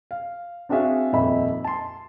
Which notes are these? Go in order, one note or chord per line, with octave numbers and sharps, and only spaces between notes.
F5
C4 D4 F#4 G#4 E5 F5
D#1 F2 D#4 E5 B5
A5 C6